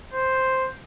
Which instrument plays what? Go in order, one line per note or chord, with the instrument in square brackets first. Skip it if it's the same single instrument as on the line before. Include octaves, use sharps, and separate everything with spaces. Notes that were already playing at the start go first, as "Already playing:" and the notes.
[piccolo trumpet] C5